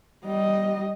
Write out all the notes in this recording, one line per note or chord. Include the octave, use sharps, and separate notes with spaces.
G3 D#5